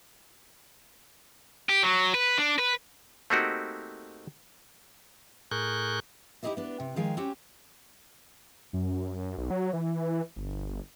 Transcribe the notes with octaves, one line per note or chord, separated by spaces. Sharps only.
G4
F#3
B4
D4
B4
A3 A#3 C4 D#4 F#4 G4
A2 G#4 A#4 C#6 F#6 G6
D#4 E4 G4 G#4 D#5 E5
B3 D4
C3
D#3 F3 G#3 G#4 F5 G5
C4 C#4 F#4 G4
F#2
B1
F#3
E3
G1